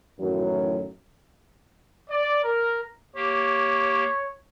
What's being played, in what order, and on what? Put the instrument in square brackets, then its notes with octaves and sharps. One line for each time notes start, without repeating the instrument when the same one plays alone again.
[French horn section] F#2 A2 D#3 E3 F#3
[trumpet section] D5
A#4
[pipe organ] A#3 G4 [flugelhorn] C#5